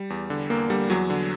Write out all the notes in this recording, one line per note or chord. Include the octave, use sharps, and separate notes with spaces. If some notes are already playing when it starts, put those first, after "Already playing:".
Already playing: G3
E2
D3
E2 A#3
D3 G3
E2 F#3
D3